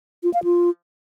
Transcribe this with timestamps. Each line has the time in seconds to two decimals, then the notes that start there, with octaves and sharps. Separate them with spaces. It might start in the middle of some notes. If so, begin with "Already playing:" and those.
0.23 F4
0.34 F5
0.44 F4